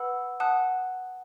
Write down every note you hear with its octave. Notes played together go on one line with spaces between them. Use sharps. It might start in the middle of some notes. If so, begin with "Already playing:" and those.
Already playing: B4 F#5 B5 E6
F#5 A5 D#6 F#6